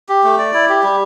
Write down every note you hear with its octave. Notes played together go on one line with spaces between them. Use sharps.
G4
A3
D5
E4
G4
G3